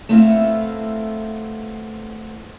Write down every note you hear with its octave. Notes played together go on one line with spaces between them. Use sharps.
A3 B3 C4 E4 F5